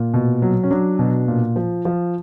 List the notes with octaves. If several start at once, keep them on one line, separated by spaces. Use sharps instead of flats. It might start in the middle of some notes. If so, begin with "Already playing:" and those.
Already playing: A#2
B2
F#3
C#4
F#3 D4
B2
A#2
F3
F3